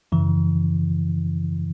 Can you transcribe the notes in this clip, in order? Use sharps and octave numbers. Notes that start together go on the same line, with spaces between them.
F#2 C#3 E3